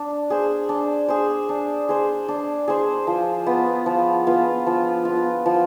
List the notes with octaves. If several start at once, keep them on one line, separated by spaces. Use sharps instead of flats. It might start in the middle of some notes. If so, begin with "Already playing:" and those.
Already playing: D4
G#4 C5
D4
G#4 C5
D4
G#4 C5
D4
G#4 C5
F3
B3 F4
F3
B3 F4
F3
B3 F4
F3